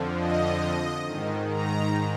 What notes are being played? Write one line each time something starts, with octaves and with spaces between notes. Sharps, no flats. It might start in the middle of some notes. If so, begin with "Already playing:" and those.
Already playing: F2 D3 F3
D#5
G#2 D#3
A#5